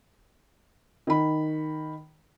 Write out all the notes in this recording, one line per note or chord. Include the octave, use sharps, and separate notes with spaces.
D#3 B5